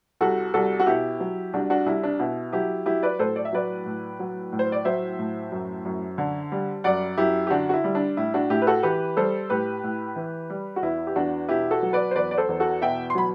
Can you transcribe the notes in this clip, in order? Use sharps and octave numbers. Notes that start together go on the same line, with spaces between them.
C2 F#4 A4
C2 F#4 A4
F#4
B2 E4 G4
F#3
C2 D4 F#4
D4 F#4
C2 E4
D4
B2 E4
F#3 E4 G4
F#3 E4 G4
B4 D5
A2 A4 C5
D5
E5
F#3 B4 D5
A2
F#3
A2
C5
D5
F#3 C5 E5
A2
F#2
F#2
D3
G3
F#2 D5 F#5
F#2 E4 G4
G4
D3 D4 F#4
F#4
E4
G3
D4
A2 E4
D4 F#4
A2 E4 G4
B4
F#4 A4
E3 G4 B4
G3 A4 C5
A2 G4 B4
A2
E3
G3
F#4
E2 E4
G4
E2 D4 F#4
B2 E4 G4
F#4 A4
F#3
B4 D5
C5
E2 B4 D5
D5
A4 C5
E2
F#4 A4
B2 E5 G5
C6
F#3 B5